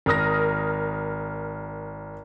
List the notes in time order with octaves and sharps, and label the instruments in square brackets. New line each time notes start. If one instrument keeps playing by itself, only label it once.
[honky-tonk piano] G#1 A#4 D#6 A#6